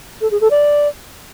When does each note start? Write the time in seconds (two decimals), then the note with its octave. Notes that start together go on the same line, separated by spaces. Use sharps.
0.21 A4
0.31 G#4
0.41 A4
0.51 D5